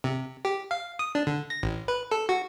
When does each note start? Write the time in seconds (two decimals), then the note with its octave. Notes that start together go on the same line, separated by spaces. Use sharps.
0.04 C3
0.45 G4
0.71 F5
0.99 D#6
1.15 D4
1.27 D3
1.50 A#6
1.63 A1
1.88 B4
2.11 A4
2.29 F#4